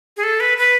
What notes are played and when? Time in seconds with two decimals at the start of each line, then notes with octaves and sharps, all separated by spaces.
0.17 G#4
0.23 A4
0.40 B4
0.58 B4